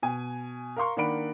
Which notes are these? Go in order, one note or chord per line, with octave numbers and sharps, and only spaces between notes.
B2 G#5
A#4 F5 A#5 C6 C#6
D#3 A#3 D4 F#5 B5 D7